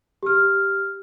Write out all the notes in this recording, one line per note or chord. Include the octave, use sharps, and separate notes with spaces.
G4 F6